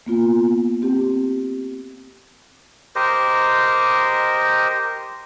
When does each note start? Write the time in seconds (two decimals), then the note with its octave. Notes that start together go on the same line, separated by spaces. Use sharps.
0.06 A#3 B3 F4
0.82 C4 G4
2.95 G4 A#4 C5 D#5